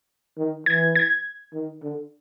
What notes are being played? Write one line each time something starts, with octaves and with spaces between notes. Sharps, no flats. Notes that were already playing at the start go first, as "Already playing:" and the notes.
D#3
E3 G#6
G#6
D#3
D3